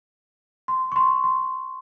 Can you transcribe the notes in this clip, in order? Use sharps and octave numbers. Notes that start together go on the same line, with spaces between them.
C6
C#6
C6
C6